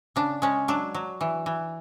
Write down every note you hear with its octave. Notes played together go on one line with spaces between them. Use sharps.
C#3 D4
G#3 C#4
F#3 D4
F#3
E3
E3